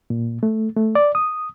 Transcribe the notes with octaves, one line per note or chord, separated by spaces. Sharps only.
A#2
A3
A3
D5
D#6